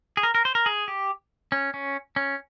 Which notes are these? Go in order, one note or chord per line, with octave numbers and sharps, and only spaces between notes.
G#4
A#4
A#4
C5
A#4
G#4
G4
C#4
C#4
C#4